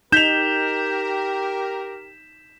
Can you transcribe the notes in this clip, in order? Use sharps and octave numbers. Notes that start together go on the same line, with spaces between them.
D#4 G4 A#4 G6 B6 E7 F7